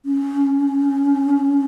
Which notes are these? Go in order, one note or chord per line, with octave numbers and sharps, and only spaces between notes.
C#4